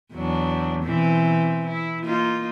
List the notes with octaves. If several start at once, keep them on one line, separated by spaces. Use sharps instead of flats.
E2 F#3 D4
B2 E3 C4
E4
A#3 D#4 F4